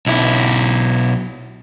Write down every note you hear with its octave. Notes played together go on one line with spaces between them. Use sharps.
B1 E4